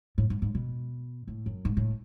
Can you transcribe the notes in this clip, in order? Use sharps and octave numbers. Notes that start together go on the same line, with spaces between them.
A2
G#2
G#2
B2
A2
F#2
G#2
A2